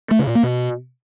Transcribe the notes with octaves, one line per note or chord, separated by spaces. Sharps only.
A3
C#3
A#2
A#3
B2